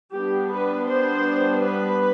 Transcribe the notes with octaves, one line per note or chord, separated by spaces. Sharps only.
G3 B3 D4 G4
B4
C5
B4